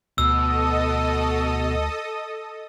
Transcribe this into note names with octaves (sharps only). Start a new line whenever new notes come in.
D2 B2 A4 D#5 D#6 E6